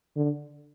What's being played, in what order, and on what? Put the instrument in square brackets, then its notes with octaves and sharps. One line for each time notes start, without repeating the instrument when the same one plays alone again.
[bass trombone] D3